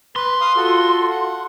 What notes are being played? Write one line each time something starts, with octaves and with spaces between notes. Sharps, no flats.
B4 C6
F5 D#6
F4 F#4 A4
F#5